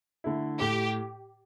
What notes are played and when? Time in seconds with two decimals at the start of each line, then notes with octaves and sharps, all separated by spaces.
0.24 D3 A3 E4
0.60 A2 G4